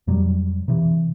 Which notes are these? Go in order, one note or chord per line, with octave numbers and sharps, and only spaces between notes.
F2 C3 F#3 G3
C3 E3